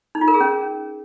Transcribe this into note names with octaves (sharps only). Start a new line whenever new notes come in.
D#4
F4
A#4
G#4
C#4